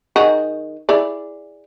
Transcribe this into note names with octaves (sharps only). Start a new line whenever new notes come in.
D#3 F#4 G#4
E4 G#4 D5